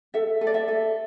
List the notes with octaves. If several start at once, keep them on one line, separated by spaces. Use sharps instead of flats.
A4 E5
A4
D5
E5
A4